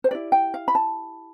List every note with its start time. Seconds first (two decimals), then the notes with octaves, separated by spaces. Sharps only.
0.04 C5
0.11 E4 G4 B4 D5
0.32 G5
0.54 F5
0.68 B5
0.75 A5